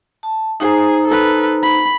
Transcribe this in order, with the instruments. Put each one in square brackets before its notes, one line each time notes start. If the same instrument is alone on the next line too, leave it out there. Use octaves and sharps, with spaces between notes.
[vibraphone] A5
[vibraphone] D#4 C5 A#5 [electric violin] G#4
[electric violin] A4 B4
B5